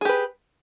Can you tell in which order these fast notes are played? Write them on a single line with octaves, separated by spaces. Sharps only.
G#4 G4 B4